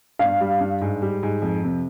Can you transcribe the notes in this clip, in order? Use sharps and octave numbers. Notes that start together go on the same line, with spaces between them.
G2 F5
G3
G2
G#2
G3
G#2
F2
C3